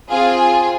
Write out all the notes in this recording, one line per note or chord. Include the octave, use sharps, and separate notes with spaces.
C4 F4 G#4 F5
G#5